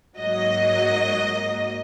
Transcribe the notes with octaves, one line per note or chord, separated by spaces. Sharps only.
G#2 F#3 A#3 D#5